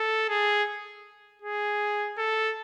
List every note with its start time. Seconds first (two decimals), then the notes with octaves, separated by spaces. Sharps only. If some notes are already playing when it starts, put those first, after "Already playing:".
Already playing: A4
0.29 G#4
1.42 G#4
2.18 A4